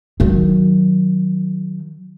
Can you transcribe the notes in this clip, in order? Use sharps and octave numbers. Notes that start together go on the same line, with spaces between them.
D#3 F#3